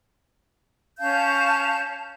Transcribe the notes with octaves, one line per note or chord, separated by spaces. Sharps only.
C#4 F5 A5 G6